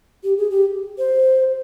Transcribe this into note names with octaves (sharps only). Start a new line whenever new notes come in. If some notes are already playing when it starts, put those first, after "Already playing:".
G4
G#4
G4
C5